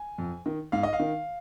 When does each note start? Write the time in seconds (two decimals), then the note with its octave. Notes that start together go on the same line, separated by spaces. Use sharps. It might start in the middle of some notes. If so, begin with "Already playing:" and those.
Already playing: G#5
0.18 F2
0.46 D#3
0.72 G#2 F5
0.83 D#5
0.93 F5
1.00 D#3